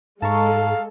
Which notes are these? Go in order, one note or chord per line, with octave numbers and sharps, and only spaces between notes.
G#2 G#3 A4 F5 A5 A#5 C#6